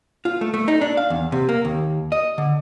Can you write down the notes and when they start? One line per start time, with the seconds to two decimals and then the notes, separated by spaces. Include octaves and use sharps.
0.25 F4
0.41 A3
0.54 A3
0.68 D#4
0.81 D4
0.97 F5
1.10 E2
1.32 C3
1.49 A#3
1.65 D#2
2.12 D#5
2.38 D3